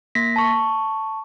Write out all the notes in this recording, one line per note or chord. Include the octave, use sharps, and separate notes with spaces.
A#3 A#6 B6
A5 C#6